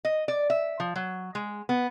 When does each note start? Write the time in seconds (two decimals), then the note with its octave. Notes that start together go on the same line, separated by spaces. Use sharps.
0.05 D#5
0.28 D5
0.50 E5
0.80 F3
0.96 F#3
1.35 G#3
1.69 B3